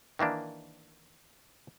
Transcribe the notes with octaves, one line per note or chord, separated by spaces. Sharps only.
D#3 E3 A#3 D4